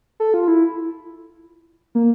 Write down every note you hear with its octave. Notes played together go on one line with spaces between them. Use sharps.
A4
F4
E4
A#3